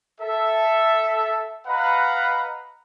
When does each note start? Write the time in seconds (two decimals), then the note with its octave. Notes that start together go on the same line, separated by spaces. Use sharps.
0.20 A4 E5
1.67 B4 D#5 F5 F#5 A#5 B5